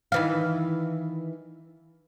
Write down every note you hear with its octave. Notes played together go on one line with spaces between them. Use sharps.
D#3 E3 F5